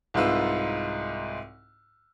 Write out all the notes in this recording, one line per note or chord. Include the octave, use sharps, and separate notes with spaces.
C2 G#2 D#4 F4 B4 E6